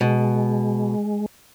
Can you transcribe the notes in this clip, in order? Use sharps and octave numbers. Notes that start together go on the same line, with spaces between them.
B2 G#3